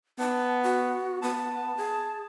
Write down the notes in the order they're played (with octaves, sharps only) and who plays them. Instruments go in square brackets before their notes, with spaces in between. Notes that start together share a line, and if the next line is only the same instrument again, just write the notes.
[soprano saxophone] B3 [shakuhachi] A5
[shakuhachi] F#4
[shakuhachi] B3 [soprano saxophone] A5
[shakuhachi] G#4